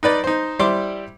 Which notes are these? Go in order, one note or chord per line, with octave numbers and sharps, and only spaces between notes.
D#4 B4 D5
D#4 C5
G3 E4 C5 C6 D6